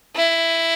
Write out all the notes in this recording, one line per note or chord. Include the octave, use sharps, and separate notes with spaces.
E4